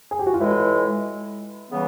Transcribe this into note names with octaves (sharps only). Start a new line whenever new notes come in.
G#4
G4
F#4
F4
A2 E3 G#3 E4
C#3 E3 G3 B3